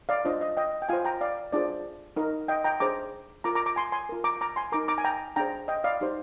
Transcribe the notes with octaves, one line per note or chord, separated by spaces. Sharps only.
D5 F5
D4 F4 C5 D#5
D#5
D#5 G5
G5
F4 C5 F5 G#5
G5 A#5
D5 F5
D4 F4 G#4 C5 D5
D#4 A#4 D#5
D#5 G5
G5 A#5
D4 G#4 C5 A#5 D6
F4 A#4 A#5 D6
A#5 D6
A#5 D6
G#5 C6
G#5 C6
F4 A#4
A#5 D6
A#5 D6
G#5 C6
D#4 A#4 A#5 D6
A#5 D6
G#5
G5 A#5
D4 G#4 C5 G5 A#5
D#5 G5
D5 F5
D#4 G4 C5